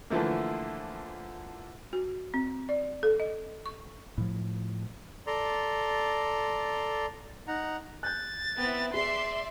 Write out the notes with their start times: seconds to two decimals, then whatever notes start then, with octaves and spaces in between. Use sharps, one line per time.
0.10 D3 E3 F3 A3 A#3
1.93 F#4
2.34 C4
2.69 D5
3.03 A4
3.20 D#5
3.66 C#6
4.18 A2 F3
5.27 A4 D5 A#5 C6
7.48 D#4 F#5 A#5
8.03 F#6 G6 A6
8.57 B3 C4 E4
8.94 G#4 D5 E5 C6 C7